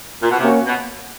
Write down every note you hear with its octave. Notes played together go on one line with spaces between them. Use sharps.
A#2
B2
C3 A#3 C#4 F#4
B2